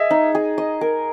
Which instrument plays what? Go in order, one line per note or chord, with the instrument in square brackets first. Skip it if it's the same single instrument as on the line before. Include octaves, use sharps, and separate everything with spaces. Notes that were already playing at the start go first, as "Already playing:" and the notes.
Already playing: [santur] G#4 D#5 [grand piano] E5
[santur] D#4
G#4
D#5
A#4